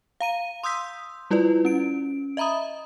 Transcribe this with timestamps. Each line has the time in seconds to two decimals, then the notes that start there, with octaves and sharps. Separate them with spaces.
0.21 F5 A#5 D#7
0.63 C6 D#6 E6 G6 B6
1.31 G3 E4 F4 B4 D5
1.65 C#4 D7
2.37 D#5 E5 A#5 B5 D#6